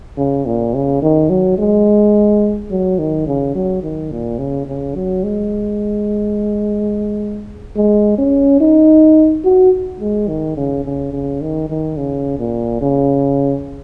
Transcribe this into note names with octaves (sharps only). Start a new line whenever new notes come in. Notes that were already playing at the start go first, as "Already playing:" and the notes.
C#3
A#2
C#3
D#3
F#3
G#3
F#3
D#3
C#3
F#3
D#3
A#2
C#3
C#3
F#3
G#3
G#3
C#4
D#4
F#4
G#3
D#3
C#3
C#3
C#3
D#3
D#3
C#3
A#2
C#3